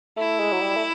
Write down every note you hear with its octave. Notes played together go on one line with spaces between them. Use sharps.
A3 E4
G#3
F#3
G3
A3